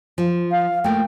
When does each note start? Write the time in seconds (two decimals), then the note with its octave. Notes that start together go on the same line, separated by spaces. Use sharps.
0.18 F3
0.51 F5
0.84 A3 A#3 G5